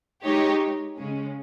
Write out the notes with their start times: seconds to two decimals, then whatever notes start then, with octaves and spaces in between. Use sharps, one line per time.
0.22 G#3 D#4 G4 C#5
0.97 C#3 G#3 C#4